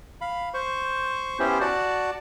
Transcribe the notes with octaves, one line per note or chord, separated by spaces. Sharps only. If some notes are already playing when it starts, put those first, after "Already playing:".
F5 B5
C5 C#6
B3 C#4 E4 G4 C5
F#4 D5 F#5 A5